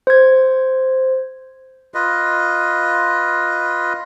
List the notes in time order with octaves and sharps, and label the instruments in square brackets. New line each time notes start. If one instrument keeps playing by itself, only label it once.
[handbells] C5 G#6
[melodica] F4 B4 D#5